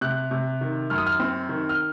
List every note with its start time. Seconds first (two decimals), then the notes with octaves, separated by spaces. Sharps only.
0.01 C3 F#6
0.31 C3
0.61 D#3
0.90 F#2 F6
0.98 D#6
1.07 F6
1.20 C4
1.49 D#3
1.69 F6